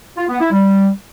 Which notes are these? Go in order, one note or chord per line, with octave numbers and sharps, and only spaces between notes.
F4
B3
E4
G3